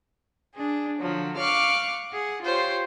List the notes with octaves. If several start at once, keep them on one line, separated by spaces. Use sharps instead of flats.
D4 G#4
D3 F3 F#3
F5 C#6 D6 F6 F#6
G#4 F#5
F4 G4 C5 C#5